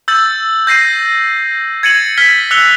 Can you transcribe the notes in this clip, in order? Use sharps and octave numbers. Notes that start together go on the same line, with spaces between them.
E6 G6 A6 F#7
G6 A#6 C7 D#7
G#6 A6 C#7 D#7 F#7
F6 G#6 A6 B6 G7
E6 F#6 A6 C#7 F7 G7